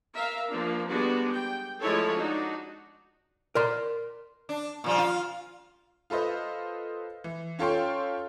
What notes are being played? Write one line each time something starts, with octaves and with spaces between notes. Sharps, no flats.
A#4 E5 F5
F3 A#3 D4
G3 G#3 B3 D4 F#4
G5
F3 G#3 A3 E4 A4 C#5
D4 D#4 F#4
A#4 D5 C6
D4
A#2 F3 G3
F4
F4 A4 B4 C5 D#5
E3
C#4 F4 A4 C#5 G5 C6